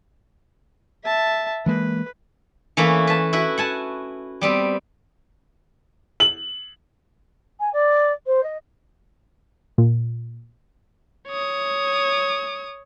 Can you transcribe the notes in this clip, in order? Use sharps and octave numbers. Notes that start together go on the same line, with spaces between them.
E5 A5
E3 G#3 A#3 B4
E3 A3 A#3 C#4 E4
B4 A5
E4 F#4 B4
F#5 G#5 A5
G3 B3 C4
F#7
G#5
D5
C5
D#5
A#2
C#5 D#6